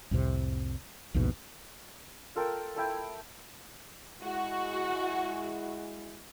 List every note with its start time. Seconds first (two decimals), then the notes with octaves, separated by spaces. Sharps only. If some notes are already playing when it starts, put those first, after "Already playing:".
0.11 C2 F2 A2 C3
1.14 A#1 D#2 G#2 B2
2.35 F4 A4 A#4 G5
2.76 A3 E4 G5
4.22 G#3 E4 F#4